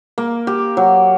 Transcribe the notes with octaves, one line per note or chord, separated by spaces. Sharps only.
A#3
G4
F#3